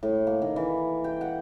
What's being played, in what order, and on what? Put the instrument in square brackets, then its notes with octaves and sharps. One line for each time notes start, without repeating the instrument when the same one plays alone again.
[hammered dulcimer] A2
A#3
D#3
E3
G5
F#5